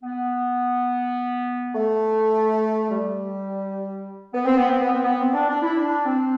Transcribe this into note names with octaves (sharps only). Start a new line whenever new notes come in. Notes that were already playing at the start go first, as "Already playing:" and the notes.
B3
A3
G3
B3
C4
B3
C4
B3
C4
B3
C4
D4
D4
E4
D4
C4